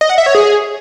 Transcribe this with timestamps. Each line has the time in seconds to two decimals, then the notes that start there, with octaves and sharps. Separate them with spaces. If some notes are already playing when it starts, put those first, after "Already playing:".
0.01 D#5
0.09 F#5
0.18 E5
0.26 C#5
0.35 G#4